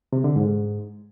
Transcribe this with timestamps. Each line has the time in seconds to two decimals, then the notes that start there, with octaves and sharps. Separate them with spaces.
0.13 C3
0.24 D3
0.36 G#2